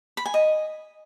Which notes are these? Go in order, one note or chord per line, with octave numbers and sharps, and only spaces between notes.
B5
G#5
D#5